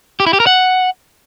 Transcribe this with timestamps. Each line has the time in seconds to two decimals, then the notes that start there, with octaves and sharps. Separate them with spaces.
0.20 G4
0.27 E4
0.33 G4
0.40 A#4
0.47 F#5